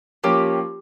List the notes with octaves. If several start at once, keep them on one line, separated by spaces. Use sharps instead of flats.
F3 A#3 C#4 G4